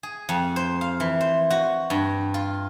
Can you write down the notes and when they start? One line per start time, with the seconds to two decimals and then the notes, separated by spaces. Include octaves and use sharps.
0.03 G#4
0.29 F2
0.56 C5
0.81 F5
1.00 E3
1.21 C5
1.50 F#4
1.90 G2
2.34 F4